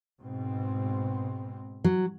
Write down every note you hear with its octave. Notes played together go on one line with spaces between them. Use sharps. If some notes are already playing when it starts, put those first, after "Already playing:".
G#2 B2 C4
F#3